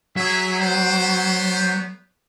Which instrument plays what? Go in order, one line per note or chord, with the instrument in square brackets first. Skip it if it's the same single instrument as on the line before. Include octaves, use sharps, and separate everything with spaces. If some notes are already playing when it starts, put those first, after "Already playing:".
[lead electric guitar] F#3 [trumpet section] G#4 E5
[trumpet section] A3 B3 C5